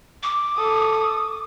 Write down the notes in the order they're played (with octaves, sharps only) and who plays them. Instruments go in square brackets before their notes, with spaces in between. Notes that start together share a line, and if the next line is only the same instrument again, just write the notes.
[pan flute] D6
[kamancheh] A4 D#6